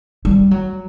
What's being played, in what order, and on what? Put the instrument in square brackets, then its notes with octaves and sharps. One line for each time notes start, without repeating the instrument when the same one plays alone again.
[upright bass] G3
F#3